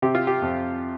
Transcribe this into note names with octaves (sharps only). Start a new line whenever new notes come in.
C3 G4
F4
G4
F2